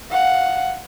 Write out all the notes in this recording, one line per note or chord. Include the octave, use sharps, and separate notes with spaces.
F5 F#5